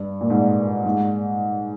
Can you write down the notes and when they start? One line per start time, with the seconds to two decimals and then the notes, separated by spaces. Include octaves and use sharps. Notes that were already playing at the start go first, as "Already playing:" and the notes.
Already playing: G2
0.21 A#2
0.30 G#2
0.85 G#2